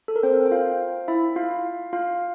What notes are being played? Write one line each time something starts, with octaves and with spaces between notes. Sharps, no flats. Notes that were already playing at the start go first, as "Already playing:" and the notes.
A4
A#4
C4 C5
G5
F4 F5
E4 E5
F4 F5
F4 F5